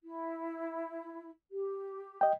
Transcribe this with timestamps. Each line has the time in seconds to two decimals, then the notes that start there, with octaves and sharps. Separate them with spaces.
0.04 E4
1.51 G4
2.21 D#5 G5